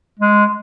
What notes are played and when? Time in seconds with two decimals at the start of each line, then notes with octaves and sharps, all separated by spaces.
0.19 G#3